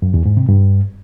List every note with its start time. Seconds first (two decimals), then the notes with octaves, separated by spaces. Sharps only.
0.02 F#2
0.14 E2
0.25 G#2
0.37 C3
0.49 G2